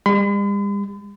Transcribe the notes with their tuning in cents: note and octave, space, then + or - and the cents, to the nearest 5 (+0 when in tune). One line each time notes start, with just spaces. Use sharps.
G3 +45 B5 +45